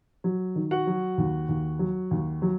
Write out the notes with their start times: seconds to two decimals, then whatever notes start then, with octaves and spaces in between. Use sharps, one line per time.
0.24 F#3
0.56 D#3
0.71 F#4 F#5
0.87 F#3
1.18 D#2
1.49 D#2
1.79 F#3
2.11 D#2
2.42 F#3